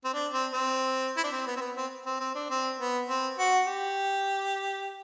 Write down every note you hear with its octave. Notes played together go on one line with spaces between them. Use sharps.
C4
D4
C4
C4
E4
D4
C4
B3
C4
B3
C4
C4
C4
D4
C4
B3
C4
F#4
G4